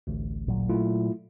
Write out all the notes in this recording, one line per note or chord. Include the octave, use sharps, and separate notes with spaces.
A1 D2
A#2 F#3
A3 E4 F4